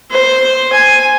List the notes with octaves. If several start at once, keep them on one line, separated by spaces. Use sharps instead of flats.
C5
G#5